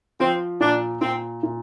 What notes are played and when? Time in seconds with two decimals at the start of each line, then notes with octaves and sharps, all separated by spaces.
0.20 F3 C4
0.60 A#2 D4
1.01 A#2 C4
1.43 A#2